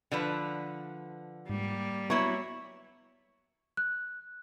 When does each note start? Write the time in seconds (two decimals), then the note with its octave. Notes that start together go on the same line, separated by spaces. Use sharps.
0.12 D3 F3 B4
1.49 G#2 G3 A#3
2.10 F#3 B3 E4 C#5 C#6
3.77 F#6